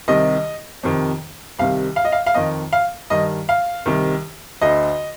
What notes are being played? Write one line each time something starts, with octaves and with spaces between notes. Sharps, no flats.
C2 C3 D#3 D#5
F2 C3 D#3
C2 C3 D#3 F5
F5
D#5
F5
F5
F2 D#3 D#5
F5
G2 D#3 D#5
F5
C2 C3 D#3
D2 D3 D#5